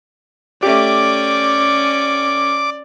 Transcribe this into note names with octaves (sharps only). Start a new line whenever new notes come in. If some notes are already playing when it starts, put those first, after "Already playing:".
A3 C#4 G4 D5 D6